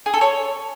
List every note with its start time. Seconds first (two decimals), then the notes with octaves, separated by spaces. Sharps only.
0.06 G#4
0.14 A4
0.21 C#5